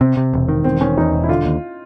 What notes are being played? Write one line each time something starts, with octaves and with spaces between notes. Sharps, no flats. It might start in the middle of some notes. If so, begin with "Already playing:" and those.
C3 C4
C3
E1
D#3
E1 C4
D#3 C#4
E2 D#4
E1
E4
D3 F4
D#2